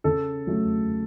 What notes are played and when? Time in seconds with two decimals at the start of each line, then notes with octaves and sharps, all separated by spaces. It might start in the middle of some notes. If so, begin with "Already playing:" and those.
0.04 C#3 A4
0.47 F#3 A3